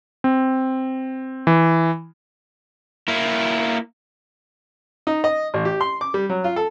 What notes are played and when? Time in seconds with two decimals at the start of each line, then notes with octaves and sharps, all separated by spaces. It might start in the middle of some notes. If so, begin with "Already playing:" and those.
0.24 C4
1.47 E3
3.08 A#3 E4
5.07 D#4
5.24 D#5
5.54 A1
5.65 G4
5.81 C6
6.01 D6
6.14 G3
6.29 F#3
6.44 F4
6.56 A4